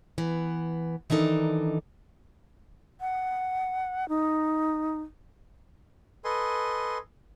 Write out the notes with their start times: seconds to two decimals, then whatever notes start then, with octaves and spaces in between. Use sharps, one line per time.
0.18 E3 B3
1.10 D#3 E3 D4 D#4 A4
3.01 F#5
4.09 D#4
6.24 A4 B4 D#5 G#5 C6